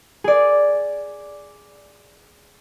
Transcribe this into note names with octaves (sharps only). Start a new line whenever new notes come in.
G#4 D5